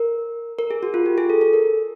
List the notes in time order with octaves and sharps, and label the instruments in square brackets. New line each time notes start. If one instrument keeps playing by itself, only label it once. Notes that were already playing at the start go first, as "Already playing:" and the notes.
Already playing: [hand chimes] A#4
A#4
G#4
F#4
F4
G4
G#4
A4
A4
A#4